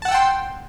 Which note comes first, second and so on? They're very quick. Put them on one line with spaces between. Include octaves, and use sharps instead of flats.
A5 F#5 E6 G5 C6